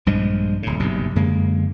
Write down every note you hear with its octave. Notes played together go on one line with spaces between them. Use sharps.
A#1 G2 F3 G#3
D1 A2
F#1 B1 G2 C3
F#2 D3 G#3 A#3